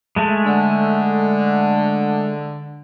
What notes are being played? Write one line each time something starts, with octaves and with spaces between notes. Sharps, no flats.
G#3 A3
D3